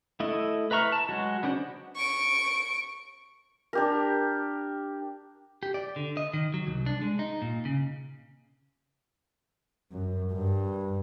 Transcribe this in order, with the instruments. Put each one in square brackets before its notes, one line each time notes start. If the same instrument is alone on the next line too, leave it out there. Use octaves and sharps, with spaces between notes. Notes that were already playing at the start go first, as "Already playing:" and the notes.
[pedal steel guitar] A3 E4 D#5
B4 E5 A#5 C#6 F6
A5
F#3 G#3 F#4
B3 C#4 D4 C5 F#5
[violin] C#6 D7
[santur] D4 G4 A#4
[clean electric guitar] G4
D5
D3
D#5
D#3
F#3
C2
D4
G#3
D#4
A#2
C#3
[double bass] F#2
G2